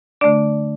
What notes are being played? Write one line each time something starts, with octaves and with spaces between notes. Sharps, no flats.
D3 A3 D4 D5